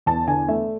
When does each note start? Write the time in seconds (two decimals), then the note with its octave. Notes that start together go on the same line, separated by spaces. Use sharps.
0.06 E2 A5
0.27 D3 G#5
0.48 A3 E5